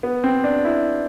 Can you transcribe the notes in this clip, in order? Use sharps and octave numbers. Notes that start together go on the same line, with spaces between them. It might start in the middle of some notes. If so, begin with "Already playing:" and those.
B3
C4
D4
E4